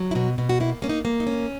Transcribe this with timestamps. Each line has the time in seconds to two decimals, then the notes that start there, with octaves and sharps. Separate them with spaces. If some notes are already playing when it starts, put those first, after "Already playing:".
Already playing: F#3
0.11 E4
0.15 B2 F#4
0.38 B2
0.49 F#4
0.60 A#3 E4
0.82 A#3 C#4
0.89 D#4
1.05 A#3
1.20 D#4
1.27 C#4